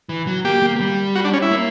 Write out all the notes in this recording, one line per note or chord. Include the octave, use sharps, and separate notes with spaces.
E3
F#3
A#3 G4
A#3
A#3
G3
F#4
D4
C#4
E4
A#3